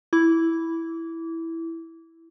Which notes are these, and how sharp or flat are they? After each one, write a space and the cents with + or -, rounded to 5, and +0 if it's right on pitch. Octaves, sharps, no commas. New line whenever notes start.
E4 +0 D6 -30